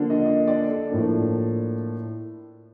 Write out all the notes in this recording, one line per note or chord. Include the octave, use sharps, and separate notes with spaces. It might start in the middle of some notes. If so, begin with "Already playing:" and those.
Already playing: D3 F3 A#3 D4
D#5
D#5
D5
A4
A2 F3 A#3 D4